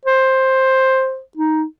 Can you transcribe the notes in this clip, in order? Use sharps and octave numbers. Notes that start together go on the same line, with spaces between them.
C5
D#4